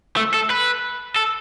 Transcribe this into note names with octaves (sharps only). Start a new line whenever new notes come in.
A3
A4
B4
A4